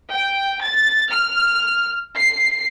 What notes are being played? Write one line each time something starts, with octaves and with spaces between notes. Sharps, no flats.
G5
A6
F6
C7